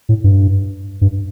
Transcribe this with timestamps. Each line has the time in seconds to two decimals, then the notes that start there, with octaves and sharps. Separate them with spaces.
0.09 A2
0.24 G2
1.01 G2